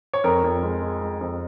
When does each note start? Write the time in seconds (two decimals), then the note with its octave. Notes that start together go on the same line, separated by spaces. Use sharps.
0.13 C#5
0.24 F2 A#4
0.44 F2
0.63 G#3
0.82 G#3
1.02 G#3
1.21 F2